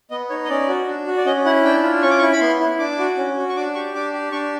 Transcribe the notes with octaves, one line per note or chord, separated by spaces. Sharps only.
B3 D#5
D#4 C#5
D#5
C#4 D5
F#4
D4
F#4
D5
C#4 D#5
E4 F#5
D4 G5
F4
C#4 C#6
D6
C#6
E4
B5
B3 C6
E4
D4 D6
F#4
C#4
F#4
C#6
D4 D6
G4 C#6
D4 D6
G4
D4 C#6